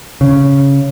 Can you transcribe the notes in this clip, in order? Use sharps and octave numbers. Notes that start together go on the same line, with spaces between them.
C#3